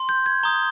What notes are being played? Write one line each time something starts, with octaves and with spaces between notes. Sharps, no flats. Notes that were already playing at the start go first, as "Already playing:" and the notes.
Already playing: C6
G6
G#6
A#5 D#6 G6 G7